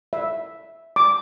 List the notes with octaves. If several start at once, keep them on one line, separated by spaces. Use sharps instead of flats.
E5
D6